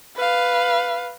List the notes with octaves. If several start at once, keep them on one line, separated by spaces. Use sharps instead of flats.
B4 F5